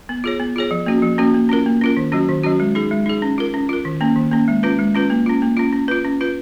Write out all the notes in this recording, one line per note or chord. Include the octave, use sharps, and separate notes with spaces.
B3
F4 G#4 C#5
B3
F4 G#4 C#5
F3
A#3 C#4 F#4
F3
A#3 C#4 F#4
A#3
C#4 F4 A#4
A#3
C#4 F4 A#4
D#3
F#3 C#4 F#4
D#3
F#3 C#4 F#4
G#3
D#4 G#4
G#3
D#4 G#4
C#4
F4 A#4
C#4
F4 A#4
D#3
A#3 C#4
D#3
A#3 C#4
G#3
C#4 F4 B4
G#3
C#4 F4 B4
A#3
C#4 F4
A#3
C#4 F4
C#4
F4 B4
C#4
F4 B4